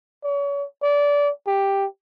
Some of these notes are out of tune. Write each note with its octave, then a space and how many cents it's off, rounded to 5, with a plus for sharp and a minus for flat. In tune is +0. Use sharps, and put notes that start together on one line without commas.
C#5 +35
D5 -25
G4 +5